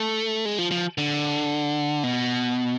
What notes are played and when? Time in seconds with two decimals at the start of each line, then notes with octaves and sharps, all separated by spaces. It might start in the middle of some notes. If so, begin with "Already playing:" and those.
Already playing: A3
0.45 G#3
0.58 F3
0.71 F3
0.98 D3
2.04 B2